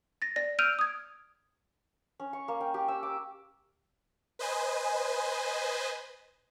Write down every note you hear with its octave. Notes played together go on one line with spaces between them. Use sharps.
A6 A#6
D5 A#6
E6 F6 G6 D7 D#7 F7
D#6 G#6
C#4
C#6
A#3
G5
G4
E6
D6
B4 C5 D#5 G#5